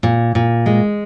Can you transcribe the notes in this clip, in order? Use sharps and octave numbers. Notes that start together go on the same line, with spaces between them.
A#2
A#2
G#3